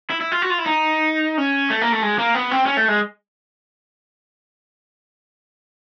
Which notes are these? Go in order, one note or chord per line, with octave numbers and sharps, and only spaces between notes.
E4
E4
F4
F#4
F4
E4
D#4
C#4
A3
A#3
A3
G#3
A#3
B3
C4
C#4
A3
G#3